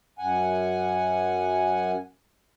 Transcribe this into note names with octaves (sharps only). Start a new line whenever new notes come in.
F#2 F#5 G#5